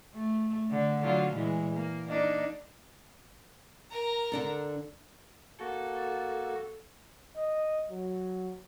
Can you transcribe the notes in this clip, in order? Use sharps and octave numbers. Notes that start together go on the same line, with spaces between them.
A3
D3
D3 F#3 F4
A#2 E3 G#3
A#3
A#3 D4 D#4
A#4 A#5
D3 D4 A4
A#3 F#4 A4
D#5
F#3